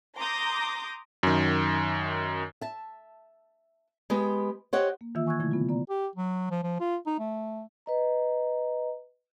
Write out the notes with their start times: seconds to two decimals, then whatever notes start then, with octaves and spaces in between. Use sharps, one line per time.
0.17 A#5 C6 D6 D#6 G6 A#6
1.23 F#2 D#3
2.61 E5 A5
4.10 G#3 B3 G4
4.73 G4 C5 C#5 D#5 F#5
5.01 A#3
5.15 D#3 E3 A#3 F4 E5 E6
5.27 G#5 C#6 E6 F#6 G#6
5.39 B2 D3 F#3 A3 E4 G#6
5.51 C3 B3 F4
5.69 B3 D5 A#5
5.90 G4
6.16 F#3
6.51 F3
6.63 F3
6.80 F4
7.07 D#4
7.19 A3
7.86 B4 D#5 A#5